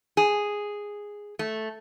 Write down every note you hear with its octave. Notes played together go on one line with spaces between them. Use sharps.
G#4
A3